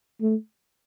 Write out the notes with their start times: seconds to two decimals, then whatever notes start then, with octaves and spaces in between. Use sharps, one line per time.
0.21 A3